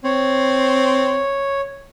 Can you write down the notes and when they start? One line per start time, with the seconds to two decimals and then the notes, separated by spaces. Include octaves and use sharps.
0.04 C4 C#5